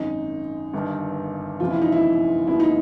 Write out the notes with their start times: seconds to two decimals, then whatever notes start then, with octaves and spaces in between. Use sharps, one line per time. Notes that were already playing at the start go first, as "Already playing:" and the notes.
Already playing: G#1 F#2 D#3 D#4
0.73 G1 G2 D#3
1.60 F#1 E2 C3 F3 F4
1.71 E4
1.82 D#4
1.92 E4
2.47 E1 D#2 C#3 F#3 B3 E4
2.60 D#4